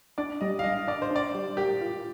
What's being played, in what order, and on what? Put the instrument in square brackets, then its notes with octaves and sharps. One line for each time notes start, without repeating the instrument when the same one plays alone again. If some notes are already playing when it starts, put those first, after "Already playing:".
[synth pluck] D4 [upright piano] D5
[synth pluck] G3 [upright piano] D#5
[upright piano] F5
[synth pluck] D4 [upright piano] D#5
[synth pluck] D4 [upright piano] D5
[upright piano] C5
[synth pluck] D4 [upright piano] D5
[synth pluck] G3
[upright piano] G4 [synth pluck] A#4
[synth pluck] F4